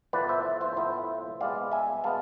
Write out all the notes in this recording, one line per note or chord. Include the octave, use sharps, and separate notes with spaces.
A2 F3 B3 E4 B4 D5
C5 E5
C5 E5
A2 F3 B3 E4 C5 E5
B2 G#3 B3 D5 F5
E5 G#5
B2 G#3 B3 F5 A5